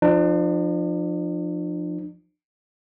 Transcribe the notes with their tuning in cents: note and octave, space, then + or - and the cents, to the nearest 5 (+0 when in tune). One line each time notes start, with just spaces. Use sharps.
F3 +0 D4 +40